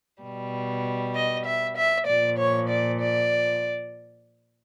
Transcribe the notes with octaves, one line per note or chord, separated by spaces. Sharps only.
B2 G3
D#5
E5
E5
A#2 F3 D5
C#5
D5
D5